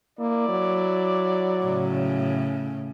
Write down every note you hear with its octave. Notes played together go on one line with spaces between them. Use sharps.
A#3 E4 D5
F#3
A2 C#3